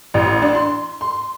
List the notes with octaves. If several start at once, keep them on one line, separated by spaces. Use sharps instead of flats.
A1
D4
C6
C6